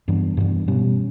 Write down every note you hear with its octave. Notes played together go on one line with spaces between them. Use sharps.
G2 E3 B3 D4
G2 E3 B3 D4
B2 G3 C#4